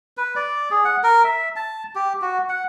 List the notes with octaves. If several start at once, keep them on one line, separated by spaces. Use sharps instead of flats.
B4
D5
G#4
F#5
A#4
E5
A5
G4
F#4
F#5